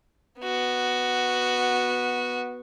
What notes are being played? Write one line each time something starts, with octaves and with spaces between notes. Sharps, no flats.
B3 F#4